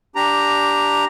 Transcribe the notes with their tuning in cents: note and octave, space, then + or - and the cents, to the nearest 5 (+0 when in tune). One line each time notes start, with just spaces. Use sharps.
D4 -10 G4 +0 A#5 +0